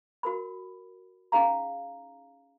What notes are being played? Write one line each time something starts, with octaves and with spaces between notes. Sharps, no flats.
F#4 A#4 B5
C#4 D#4 G#4 F5 A#5